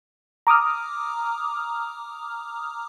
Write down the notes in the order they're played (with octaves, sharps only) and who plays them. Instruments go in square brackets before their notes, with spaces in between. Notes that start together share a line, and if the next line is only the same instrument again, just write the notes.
[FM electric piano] A#5 D6 D#6 F6